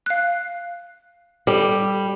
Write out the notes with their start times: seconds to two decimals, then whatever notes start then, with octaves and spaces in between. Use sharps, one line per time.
0.06 F5 F#6
1.47 G3 A4